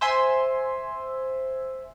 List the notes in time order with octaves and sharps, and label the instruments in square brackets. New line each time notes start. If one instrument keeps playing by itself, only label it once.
[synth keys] C5 E5 G#5 C6